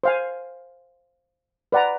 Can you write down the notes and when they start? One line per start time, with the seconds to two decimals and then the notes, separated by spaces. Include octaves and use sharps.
0.04 C5 F5 G#5
1.72 B4 D5 F#5 A#5